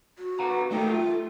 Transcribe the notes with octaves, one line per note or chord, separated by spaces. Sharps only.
F#4
B4 F#5 A#5
G3 A3 D#4 G5
F4